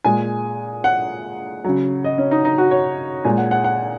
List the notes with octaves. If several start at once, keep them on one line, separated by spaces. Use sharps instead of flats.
A#2 G#3 G#5
F#5
C#3 F#3
D#5
C#4
D#4
D#4
F#4
C#5
A#2 G#3 G#5
F#5
F#5
F#5